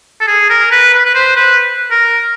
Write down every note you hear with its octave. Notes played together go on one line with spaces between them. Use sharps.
A4
G#4
A#4
B4
B4
B4
C5
B4
A#4